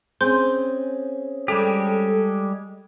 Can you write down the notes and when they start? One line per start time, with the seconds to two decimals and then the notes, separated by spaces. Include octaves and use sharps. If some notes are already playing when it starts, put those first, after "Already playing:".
0.21 C4 C#4 G#4 C5 C6 G6
1.48 G3 G#3 G4 A4